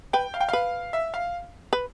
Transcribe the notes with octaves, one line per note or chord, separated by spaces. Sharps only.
B4 G5
F5
G5
B4 F5
E5
F5
B4